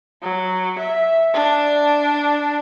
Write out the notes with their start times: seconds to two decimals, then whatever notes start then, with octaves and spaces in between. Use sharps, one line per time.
0.22 F#3
0.79 E5
1.34 D4